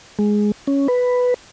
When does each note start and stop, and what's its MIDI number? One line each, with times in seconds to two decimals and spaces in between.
0.19 0.52 56
0.67 0.88 61
0.88 1.34 71